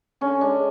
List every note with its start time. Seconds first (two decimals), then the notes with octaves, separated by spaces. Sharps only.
0.21 D3 C#4
0.41 G#3 D4